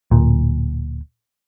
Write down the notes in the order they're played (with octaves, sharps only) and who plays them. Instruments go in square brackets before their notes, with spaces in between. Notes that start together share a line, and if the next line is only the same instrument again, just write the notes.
[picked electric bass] D1 A#2